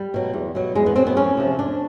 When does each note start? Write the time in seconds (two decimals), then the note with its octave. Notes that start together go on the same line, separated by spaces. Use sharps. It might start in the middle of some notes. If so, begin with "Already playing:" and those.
Already playing: G3
0.14 B2 F#3
0.33 E2
0.55 B2 F#3
0.75 E2 G#3
0.86 B3
0.96 B2 F#3 C4
1.07 B3
1.16 F2 C#4
1.37 C3 F3
1.59 F2 D4